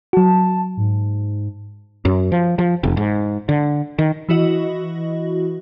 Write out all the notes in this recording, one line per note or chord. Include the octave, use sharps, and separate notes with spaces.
F#3 F#4 A5
G#2
F#2
F3
F3
F1
G#2
D3
D#3
E3 E4 F#4 D#5